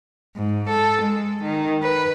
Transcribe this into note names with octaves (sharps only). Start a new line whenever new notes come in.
G#2
A4
G#3
D#3
B4